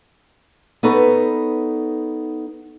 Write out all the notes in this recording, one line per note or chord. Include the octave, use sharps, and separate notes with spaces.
B3 D#4 A4 B4 C#5